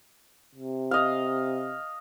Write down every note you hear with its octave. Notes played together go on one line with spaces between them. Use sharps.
C3
D#5 F5